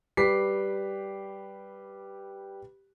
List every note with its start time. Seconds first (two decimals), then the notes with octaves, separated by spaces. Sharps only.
0.17 G3 G4 B4 D6 B6 C7